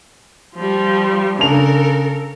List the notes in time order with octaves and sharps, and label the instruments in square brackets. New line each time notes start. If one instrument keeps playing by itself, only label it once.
[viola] F3 G3
[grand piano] C#3 D4 F7 [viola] A4 A#4